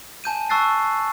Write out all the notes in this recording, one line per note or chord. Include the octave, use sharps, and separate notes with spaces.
G#5 A5 G6 D#7
A5 C#6 E6 F#6 A6 C7